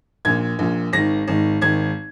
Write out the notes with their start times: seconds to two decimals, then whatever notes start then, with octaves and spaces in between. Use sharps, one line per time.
0.25 A#1 A#2 G#6
0.59 A#1 A#2
0.93 G#1 G#2 D#3 A#6
1.28 G#1 G#2 D#3
1.61 G#1 G#2 D#3 G#6